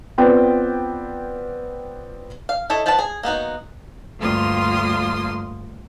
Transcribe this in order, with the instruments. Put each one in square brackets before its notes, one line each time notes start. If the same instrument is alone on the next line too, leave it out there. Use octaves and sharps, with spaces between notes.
[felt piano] B3 C4 F4 B4 D5 G5
[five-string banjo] F5
E4 A4 C#5 D#5
F3 F4 B4 F#5 A5
G#4
A#3 B3 D#4 F#4
[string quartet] D2 G2 A#3 F4 C6 D#6